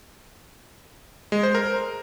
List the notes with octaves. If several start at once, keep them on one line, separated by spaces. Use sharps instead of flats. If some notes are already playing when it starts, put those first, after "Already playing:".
G#3
C5
A#4